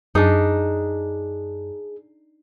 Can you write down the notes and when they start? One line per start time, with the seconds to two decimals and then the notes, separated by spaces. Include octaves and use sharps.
0.15 F#2 D4 D#4 G#4